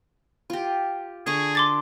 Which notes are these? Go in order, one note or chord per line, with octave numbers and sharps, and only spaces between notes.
F4 G4
D3 G#4 A#5 C#6
C6 D6 A6